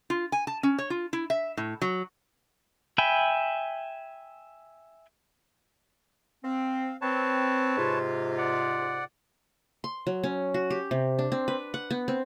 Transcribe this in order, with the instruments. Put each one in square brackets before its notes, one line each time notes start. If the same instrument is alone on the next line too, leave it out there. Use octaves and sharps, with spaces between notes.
[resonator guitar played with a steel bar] F4
G#5
A5
C#4
C#5
F4
E4
E5
A2
F#3
[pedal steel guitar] E5 G5 G#5 B5
[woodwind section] C4 [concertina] F5
[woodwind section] C4 [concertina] B4 C#5 A5
[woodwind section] G#2 C3 F4
[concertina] D5 F#5
[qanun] C6
F#3
C#4
F#4
G4
C3
D4
C4
B4
F#5
B3
C4